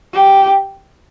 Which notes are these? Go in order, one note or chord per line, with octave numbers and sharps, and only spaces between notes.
G4